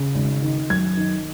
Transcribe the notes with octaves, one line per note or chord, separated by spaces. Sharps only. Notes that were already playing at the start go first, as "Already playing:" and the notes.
Already playing: C#3
G#1
D#3
F#2 G#6
D#3